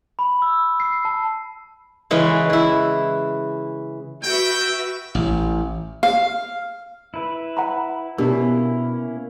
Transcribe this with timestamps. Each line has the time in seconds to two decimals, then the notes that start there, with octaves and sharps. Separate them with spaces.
0.19 B5
0.42 E6
0.80 C7
1.05 A5
2.11 C#3 E3 G#3
2.50 E3 E4
4.23 F#4 B4 E5 G5
5.15 A1
6.03 F5
7.14 E4 B4
7.57 F#5 A#5 B5
8.18 B2 A#3 C#4 D4 E4 G4 E6